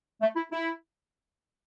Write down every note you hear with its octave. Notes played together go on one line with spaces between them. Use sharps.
A3
E4
E4